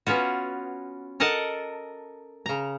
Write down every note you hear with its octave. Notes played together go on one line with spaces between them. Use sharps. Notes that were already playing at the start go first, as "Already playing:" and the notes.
B3 C#4 F4 F#4
A4 A#4 D#5 F#5 A5
C#3 A#5